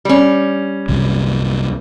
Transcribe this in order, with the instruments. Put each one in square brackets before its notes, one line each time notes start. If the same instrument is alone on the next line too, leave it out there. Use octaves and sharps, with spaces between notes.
[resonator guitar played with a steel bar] G3 C#4
[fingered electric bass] C2 F#2 C3